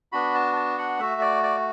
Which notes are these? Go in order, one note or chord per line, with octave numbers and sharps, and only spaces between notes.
B3 D4 F#4 B5
A5
A5
F#5
A3 F#4 E5
D5
D5